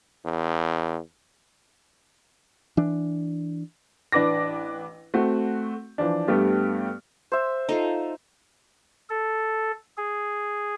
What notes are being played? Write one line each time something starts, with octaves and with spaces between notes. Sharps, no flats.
E2
E3 D4
A1 D4 B4 D6 A#6
A3 C4 F#4
E3 F3 D4
G2 G3 A3 B3 G4
C5 E5
D#4 F4 A4
A4
G#4